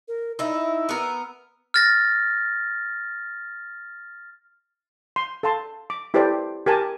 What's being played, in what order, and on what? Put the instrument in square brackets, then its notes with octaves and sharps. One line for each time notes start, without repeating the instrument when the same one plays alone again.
[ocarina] A#4
[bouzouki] D#4 E4 [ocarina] E6
[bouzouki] B3 A#4
[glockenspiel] F6 A6 A#6
[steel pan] C6
A4 F5 A5 C6
D6
E4 G4 A4 B4 C5 D5
G4 A#4 G#5 A5